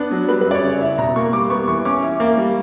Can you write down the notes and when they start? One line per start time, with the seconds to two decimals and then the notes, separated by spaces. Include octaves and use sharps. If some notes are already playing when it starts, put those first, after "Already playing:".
Already playing: B3 D4
0.11 F#3
0.28 G3 B4
0.41 B4
0.46 F#2 D5
0.54 C#5
0.63 C#3
0.81 E4 E5
0.98 B2 A#5
1.16 A#3 C#6
1.33 G3 D6
1.50 B3 C#6
1.68 E3 C#6
1.85 C#4 D6
2.03 E4
2.20 A#3
2.37 G3